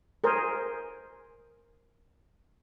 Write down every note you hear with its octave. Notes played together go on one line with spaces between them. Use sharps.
G#4 A#4 C5